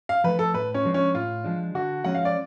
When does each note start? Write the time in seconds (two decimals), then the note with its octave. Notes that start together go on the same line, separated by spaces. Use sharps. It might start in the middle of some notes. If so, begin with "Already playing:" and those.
0.09 F5
0.24 F3 A3 B4
0.39 A4
0.54 A2 B4
0.74 C#4
0.85 F3 G#3 D4
0.94 C#4
1.14 A2 F4
1.44 F3 G#3 D4
1.74 D3 F#4
2.04 F3 G#3 C#4 F#5
2.15 F5
2.25 D5